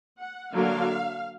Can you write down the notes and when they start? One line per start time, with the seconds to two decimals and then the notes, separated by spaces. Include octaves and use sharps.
0.18 F#5
0.54 D3 F#3 A#3 D4 F5